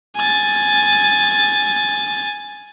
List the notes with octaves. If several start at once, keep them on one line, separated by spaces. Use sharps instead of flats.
G#5 A6